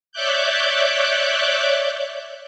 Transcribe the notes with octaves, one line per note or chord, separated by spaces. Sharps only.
C#5 D5 E5 D6 F#6 G6